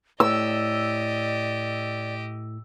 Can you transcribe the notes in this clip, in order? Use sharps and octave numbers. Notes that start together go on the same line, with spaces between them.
A2 G4 D5 D#5 E6